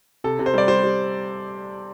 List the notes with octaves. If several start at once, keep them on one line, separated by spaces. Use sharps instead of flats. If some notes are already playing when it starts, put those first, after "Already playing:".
C3 A4
C3
C5
G3 D5
G3 C5
G3